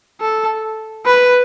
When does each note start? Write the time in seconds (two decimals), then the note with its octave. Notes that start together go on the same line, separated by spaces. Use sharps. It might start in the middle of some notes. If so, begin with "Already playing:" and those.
0.20 A4
1.06 B4